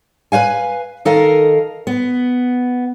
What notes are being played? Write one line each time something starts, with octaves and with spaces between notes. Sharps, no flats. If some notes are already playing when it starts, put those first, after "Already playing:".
B4 C#5 F5 G#5
D#3 A4 A#4 D#5 F5
B3